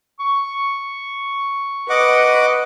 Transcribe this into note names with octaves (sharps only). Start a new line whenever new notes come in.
C#6
B4 D#5 F#5 D6